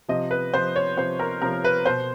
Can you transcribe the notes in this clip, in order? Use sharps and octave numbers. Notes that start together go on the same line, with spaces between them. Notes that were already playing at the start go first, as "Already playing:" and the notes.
C3 F3 D#5
B4
C3 F3 C5
C#5
C3 F3 C5
A#4
C3 F3 A#4
B4
B2 C5